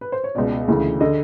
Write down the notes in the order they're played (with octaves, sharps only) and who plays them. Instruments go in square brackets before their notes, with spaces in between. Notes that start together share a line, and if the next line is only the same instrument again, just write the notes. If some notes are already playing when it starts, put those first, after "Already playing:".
[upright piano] B4
C5
C#5
C#2 B2 D5
D2 C#3 E3
D3 D#5